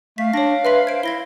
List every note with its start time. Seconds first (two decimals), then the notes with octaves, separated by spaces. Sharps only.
0.18 A3 F5 B6
0.34 D4 C#5 A#6
0.65 B4 E5 C6 B6
0.87 C5 G#6 D7
1.03 E4 G#6 A#6 G7